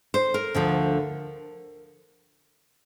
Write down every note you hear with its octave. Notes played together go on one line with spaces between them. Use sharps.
C5
A#4
D2 D3 F3